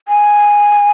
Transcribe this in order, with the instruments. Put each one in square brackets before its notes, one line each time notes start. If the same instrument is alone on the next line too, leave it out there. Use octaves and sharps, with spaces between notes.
[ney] G#5